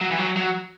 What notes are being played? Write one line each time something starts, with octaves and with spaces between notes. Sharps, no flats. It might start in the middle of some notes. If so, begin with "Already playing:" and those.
F#3
E3
F#3
F#3